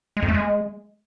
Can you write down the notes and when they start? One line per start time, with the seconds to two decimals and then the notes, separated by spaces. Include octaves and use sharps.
0.17 G#3
0.22 F2
0.28 A3
0.34 G#3